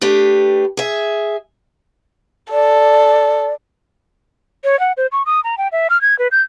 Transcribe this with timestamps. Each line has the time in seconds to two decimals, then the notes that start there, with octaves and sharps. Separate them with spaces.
0.01 A3 D4 G4 B4
0.77 G#4 E5
2.52 A4 D5
4.64 C#5
4.80 F#5
4.97 C5
5.12 C#6
5.26 D#6
5.44 A#5
5.58 G5
5.72 E5
5.90 F6
6.01 G#6
6.19 B4
6.32 G6